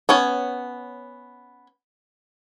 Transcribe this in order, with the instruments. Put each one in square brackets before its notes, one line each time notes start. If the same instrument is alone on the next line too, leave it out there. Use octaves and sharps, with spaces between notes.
[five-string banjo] B3 C#4 C#5